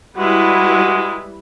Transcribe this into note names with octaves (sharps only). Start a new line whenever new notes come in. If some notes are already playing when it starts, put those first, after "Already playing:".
G3 G#3 E4 F#4 B4